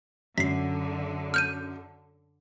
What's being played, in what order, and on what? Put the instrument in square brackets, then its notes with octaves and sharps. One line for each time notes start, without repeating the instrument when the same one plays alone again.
[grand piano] F#2 [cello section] D3 [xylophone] B6 C7
[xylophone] F6 G6 D#7